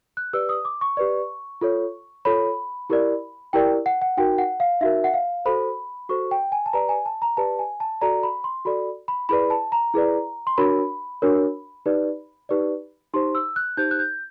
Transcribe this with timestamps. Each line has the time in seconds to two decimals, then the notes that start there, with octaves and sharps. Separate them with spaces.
0.17 F#6
0.33 G4 B4 D5 E6
0.49 D#6
0.65 D6
0.81 C#6
0.97 G4 B4 D5
1.61 F4 A4 C#5
2.25 F4 A4 C#5 B5
2.90 E4 G4 A#4 D5
3.53 E4 G4 A#4 D5 G5
3.86 F#5
4.02 F#5
4.17 D#4 F#4 A#4 G5
4.38 F#5
4.60 F5
4.81 D#4 F#4 A#4 E5
5.04 F#5
5.14 F5
5.45 F#4 A4 C5 B5
6.09 F#4 A4 C5 C#6
6.31 G5
6.52 G#5
6.66 A5
6.73 G4 B4 D5 A#5
6.89 G#5
7.06 A5
7.22 A#5
7.37 G4 B4 D5 A5
7.59 G#5
7.80 A5
8.01 F#4 A4 D5 A#5
8.23 B5
8.44 C6
8.65 F#4 A4 D5 B5
9.08 B5
9.29 E4 G#4 B4 D5 B5
9.50 A5
9.72 A#5
9.94 E4 G#4 B4 D5
10.47 C6
10.58 D4 F#4 A#4 C#5 B5
11.22 D4 F#4 A#4 C#5
11.86 D#4 G4 B4 D5
12.49 D#4 G4 B4 D5
13.13 D#4 G4 C5 C6
13.35 E6
13.56 F#6
13.77 D#4 G4 C5 G6
13.91 F#6
13.99 G6